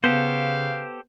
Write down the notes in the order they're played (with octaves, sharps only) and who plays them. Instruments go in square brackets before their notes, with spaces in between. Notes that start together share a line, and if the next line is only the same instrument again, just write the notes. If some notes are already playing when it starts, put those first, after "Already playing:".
[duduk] C#3 [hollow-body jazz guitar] B3 [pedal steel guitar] G4 A4 C5 [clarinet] F5